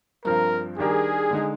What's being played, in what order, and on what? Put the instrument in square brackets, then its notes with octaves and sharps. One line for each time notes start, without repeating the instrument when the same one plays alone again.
[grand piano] G2 F3 C4 [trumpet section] A#4
[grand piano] D#3 G3 D4 G4 A#4 [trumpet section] G#4
[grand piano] D3 G#3 D#4